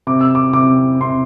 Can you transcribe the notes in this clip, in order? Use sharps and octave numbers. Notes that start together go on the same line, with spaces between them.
C3 D6
E6
D6
C3 D6
C3 C6